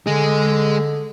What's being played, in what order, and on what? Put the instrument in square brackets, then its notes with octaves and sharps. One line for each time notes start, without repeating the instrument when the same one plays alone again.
[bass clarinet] D3 [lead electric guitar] G#3 G#4